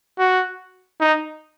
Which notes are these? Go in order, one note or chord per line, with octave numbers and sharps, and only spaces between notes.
F#4
D#4